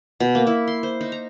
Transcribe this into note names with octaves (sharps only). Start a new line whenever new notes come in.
B2
A#3
E4
C6
C5
D#4
A#5